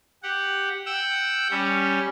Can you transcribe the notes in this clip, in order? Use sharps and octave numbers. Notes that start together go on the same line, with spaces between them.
G4 F#5
F#5 G5 E6
G3 C#4